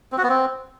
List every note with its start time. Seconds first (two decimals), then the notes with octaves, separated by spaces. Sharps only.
0.12 C4
0.18 F#4
0.23 B3
0.29 C4